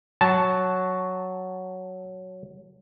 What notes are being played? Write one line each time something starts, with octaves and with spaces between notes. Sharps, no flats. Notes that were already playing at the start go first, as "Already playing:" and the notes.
F#3 A5